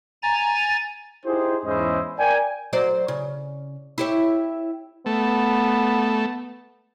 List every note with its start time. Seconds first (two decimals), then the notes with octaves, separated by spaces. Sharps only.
0.23 G#5 A#5 A6
1.25 D#4 E4 G4 G#4 C5
1.65 E2 G#2 C#4 E4 C5 D#5
2.19 A#4 D5 G5 G#5
2.73 F#3 C5 D5
3.08 C#3
3.98 E4 G4 C#5
5.06 A3 B3